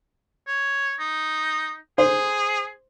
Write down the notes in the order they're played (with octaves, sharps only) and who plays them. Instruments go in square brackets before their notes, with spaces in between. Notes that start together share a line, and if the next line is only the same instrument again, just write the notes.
[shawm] C#5
D#4
[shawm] G#4 [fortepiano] C5